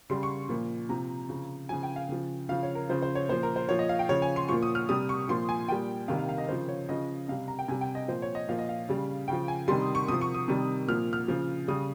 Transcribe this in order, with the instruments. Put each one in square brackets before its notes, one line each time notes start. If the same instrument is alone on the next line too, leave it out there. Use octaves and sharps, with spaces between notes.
[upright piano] C#3 G3 C6
C#6
A#2 F3
C3 F3 A#5
C#3 F3
C#3 F3 G#5
G5
F5
C#3 F3
C#3 F3 F5
C#5
A#4
C#3 F3 C5
C5
C#5
A#2 F3 C5
A#4
C5
A#2 F3 C#5
D#5
F5
G5
C#3 F3 C#5
G#5
C6
A#2 F3 C#6
D#6
F6
C3 G3 D#6
C#6
A#2 F3 C6
G#5
A#2 G3 G5
C3 D#3 G3 F5
F5
F5
D#5
C#3 F3 C5
C#5
C#3 F3 D#5
C3 G3 F5
A#5
G5
C3 G3 G#5
G5
D#5
A#2 F3 C5
C#5
D#5
A#2 F3 F5
D#5
F5
C#3 G3
C#3 F3 G5
G#5
C3 D#3 G3 C6
D#6
C#6
C3 F3 D#6
C#6
D#6
C3 D#3 G3
A#2 F3 F6
F6
C#3 F3
C#3 G3 D#6